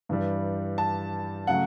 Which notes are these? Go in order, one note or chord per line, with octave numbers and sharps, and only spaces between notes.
G2 E3 G3
A5
C#3 F#3 A3 F#5